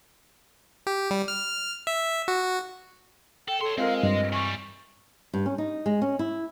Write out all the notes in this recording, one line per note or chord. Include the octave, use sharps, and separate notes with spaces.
G4
G3
F6
E5
F#4
A4 G5
A4 C#5 C6 C#7
G#3 C4 F4 A#4 F5
G2 D#5
E3 G3 C#6
G2
C#4
D#4
G#3
C#4
E4